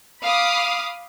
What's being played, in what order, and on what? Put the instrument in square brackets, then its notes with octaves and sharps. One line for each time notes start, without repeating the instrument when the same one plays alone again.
[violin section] F5 B5 D6 D#6